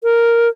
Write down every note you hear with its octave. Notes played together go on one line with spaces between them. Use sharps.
A#4